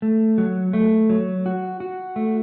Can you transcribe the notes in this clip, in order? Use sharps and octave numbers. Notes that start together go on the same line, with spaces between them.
A3
F#3
A3
F#3
F#4
F#4
A3